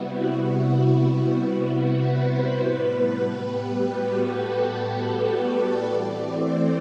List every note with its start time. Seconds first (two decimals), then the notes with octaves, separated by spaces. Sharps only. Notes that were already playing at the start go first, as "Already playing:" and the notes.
Already playing: C3 G3 B3 E4 F#4
0.56 F#4
0.97 F#4
1.78 B4
2.19 C5
2.59 A2 G3 B3 B4
3.40 G4
3.81 F#4
4.21 A4
4.63 B4
5.03 B4
5.44 D5
5.84 E3 A3 C4 D5
6.25 C5